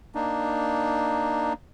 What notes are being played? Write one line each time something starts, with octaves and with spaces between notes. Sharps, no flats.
A#3 D4 D#4